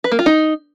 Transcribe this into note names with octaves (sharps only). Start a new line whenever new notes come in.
B4
A#3
F4
D#4